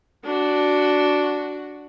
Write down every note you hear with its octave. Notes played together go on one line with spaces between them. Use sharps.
D4 F#4